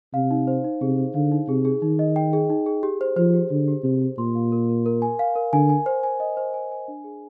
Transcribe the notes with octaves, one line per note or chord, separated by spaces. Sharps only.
C3 F5
D#4
C5
D#4
C3 G#4
C5
D3 F5
D#4
C3 G#4
G#4
D#3 D#4
D#5
G5
G#4
D#4
G#4
G4
C5
F3 C5
G4
D3 C5
G4
C3 C5
G4
A#2 C6
F5
A#4
A#4
A#4
G#5
F5
A#4
D3 G#5
G#5
C5
G#5
D#5
C5
G#5
G#5
D4
G#4